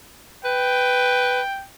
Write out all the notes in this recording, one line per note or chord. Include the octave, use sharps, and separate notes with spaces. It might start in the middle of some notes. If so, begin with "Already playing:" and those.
B4 G5